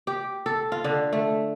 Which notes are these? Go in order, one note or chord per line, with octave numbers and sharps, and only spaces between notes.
G4
A4
F4
D3
A3